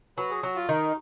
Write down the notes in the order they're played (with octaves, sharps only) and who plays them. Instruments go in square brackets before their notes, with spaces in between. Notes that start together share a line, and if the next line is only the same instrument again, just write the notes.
[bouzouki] F#3 [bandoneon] B4
[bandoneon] G#4
[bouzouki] F#3 [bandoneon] F#4
[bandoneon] F4
[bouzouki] D#3 [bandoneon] D#4